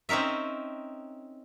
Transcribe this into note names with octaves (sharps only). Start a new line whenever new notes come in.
C4 C#4 D#4 A#4 E5